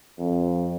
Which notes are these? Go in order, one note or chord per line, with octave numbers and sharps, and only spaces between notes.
F2